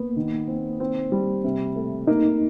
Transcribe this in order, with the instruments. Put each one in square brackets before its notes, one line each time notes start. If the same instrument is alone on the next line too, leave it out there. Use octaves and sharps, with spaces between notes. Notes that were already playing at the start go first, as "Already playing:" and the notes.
Already playing: [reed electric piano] A#3 [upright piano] B3
[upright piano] D#3
C4
C4
G3
C3
A3
[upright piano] A#3 [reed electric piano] D#4